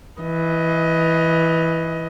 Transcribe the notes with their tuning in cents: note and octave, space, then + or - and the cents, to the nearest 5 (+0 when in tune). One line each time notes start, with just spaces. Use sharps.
E3 +0 D#5 +20